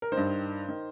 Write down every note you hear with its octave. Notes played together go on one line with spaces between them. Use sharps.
A#4
D#3 C5
G2
D#3